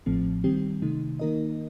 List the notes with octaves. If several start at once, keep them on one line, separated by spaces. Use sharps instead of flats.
A1 A2 F3 A3 C4
D#3 G3 C4 G4
C3 D#3 A3 D#4
D#3 A#3 D#4 A#4 D#5